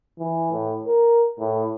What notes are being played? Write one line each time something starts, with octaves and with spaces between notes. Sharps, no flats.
E3
A2
A#4
A2